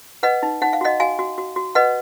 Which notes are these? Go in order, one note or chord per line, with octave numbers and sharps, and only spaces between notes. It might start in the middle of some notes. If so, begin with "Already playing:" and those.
B4 D#5 F#5
D#4
D#4 F#5
F5
F#4 D#5 F#5
F#4 F5 G#5
F#4
F#4
F#4
B4 D#5 F#5